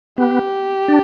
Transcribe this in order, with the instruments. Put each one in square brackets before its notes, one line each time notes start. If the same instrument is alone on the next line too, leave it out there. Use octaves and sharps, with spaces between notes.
[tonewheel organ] B3 [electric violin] G4
[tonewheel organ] D4